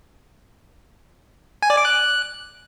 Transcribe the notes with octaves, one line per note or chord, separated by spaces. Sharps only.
G#5
D5
D6
F#6